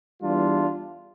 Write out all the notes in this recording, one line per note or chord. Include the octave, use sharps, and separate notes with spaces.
E2 E3 G3 D4 F4